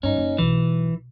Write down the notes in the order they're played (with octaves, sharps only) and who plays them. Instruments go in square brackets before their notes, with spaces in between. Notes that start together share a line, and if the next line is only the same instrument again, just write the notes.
[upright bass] G2 [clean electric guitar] C#4 D#4
[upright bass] F#1
[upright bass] B1 [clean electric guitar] E3